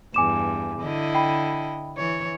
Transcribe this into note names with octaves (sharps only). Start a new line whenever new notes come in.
E2 G2 G#5 D6 E7
D3 E4 D#5
G5 B5
E3 C#5